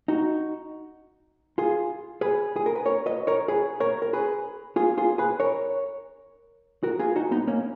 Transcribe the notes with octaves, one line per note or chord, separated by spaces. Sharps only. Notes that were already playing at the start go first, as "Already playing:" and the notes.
D#4 F#4
F4 G#4
G#4 B4
G#4
A#4
B4
A#4 C#5
B4 D#5
A#4 C#5
G#4 B4
A#4 C#5
A#4
G#4 B4
F4 G#4
F4 G#4
G#4 B4
A#4 C#5
F#4 A#4
F4 G#4
D#4 F#4
B3 D#4
A#3 C#4